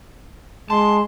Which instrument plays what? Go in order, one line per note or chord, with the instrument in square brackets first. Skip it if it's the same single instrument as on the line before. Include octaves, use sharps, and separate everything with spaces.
[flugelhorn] G#3 [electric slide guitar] A5 [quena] C6